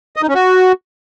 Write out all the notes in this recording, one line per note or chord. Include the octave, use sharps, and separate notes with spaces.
D#5
D#4
C#4
F#4